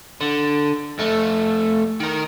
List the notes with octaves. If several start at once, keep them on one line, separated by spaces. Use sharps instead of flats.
D3
F2 A3
D#3 A#4